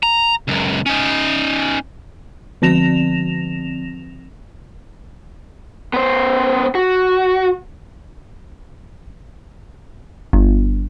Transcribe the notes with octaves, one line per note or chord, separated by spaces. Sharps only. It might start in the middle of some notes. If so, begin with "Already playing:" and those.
A#5
C#2 F#2
C#4 D#4
D3 F3 C4 A#6 E7 F7
B3 C5
F#4
G1